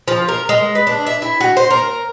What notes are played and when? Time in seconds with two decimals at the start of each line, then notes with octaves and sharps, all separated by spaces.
0.08 F3
0.28 A#4
0.49 G#3
0.75 B4
0.87 D4
1.07 E5
1.22 E4
1.40 F#4
1.57 C5
1.70 A#4